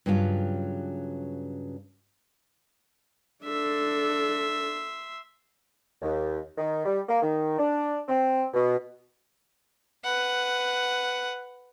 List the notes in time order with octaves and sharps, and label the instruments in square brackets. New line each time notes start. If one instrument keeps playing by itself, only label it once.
[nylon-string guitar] G2 C#3 F#3 F4 G4
[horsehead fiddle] D4 A4 [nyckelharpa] E5 C6
[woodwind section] D#2
D#3
G3
A#3
D#3
D4
C4
B2
[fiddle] B4 F#5